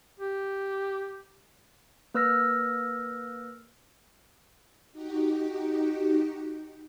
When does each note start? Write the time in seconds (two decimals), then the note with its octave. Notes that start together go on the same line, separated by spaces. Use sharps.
0.20 G4
2.14 A#3 B4 E6 F6 A#6
4.92 D#4 F#4 G4